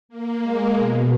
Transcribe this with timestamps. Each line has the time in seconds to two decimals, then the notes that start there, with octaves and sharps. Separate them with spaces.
0.09 A#3
0.42 G#3
0.75 B2